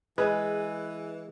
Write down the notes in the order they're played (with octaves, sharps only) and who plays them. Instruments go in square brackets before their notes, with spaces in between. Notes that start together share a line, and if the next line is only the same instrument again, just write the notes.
[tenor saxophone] E3 [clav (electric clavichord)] G#3 [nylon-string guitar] G#4 [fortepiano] B4